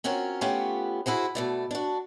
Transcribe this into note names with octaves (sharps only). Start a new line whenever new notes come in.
C4 C#4 F4 F#4 A#4
A3 B3 C#4 F4 G4 F#5
E4 F#4 G#4 C5
B2 A3 D5
D4 F#4